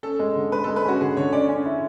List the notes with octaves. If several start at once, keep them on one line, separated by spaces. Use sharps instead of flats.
C#4 A4
G#3
D3
G#3 B4
G#3 A4
B4
C#4 F#4
D3 G#4
D3 C#5
C#4 D5
C#4
E4